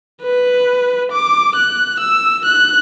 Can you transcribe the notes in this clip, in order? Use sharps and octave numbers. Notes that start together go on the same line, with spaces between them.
B4
D6
F#6
E6
F#6